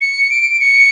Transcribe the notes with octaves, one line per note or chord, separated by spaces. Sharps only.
C#7
D7
C#7